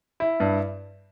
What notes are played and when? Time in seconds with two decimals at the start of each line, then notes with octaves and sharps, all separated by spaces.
0.20 E4
0.40 G2